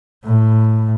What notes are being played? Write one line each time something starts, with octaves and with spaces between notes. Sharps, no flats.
A2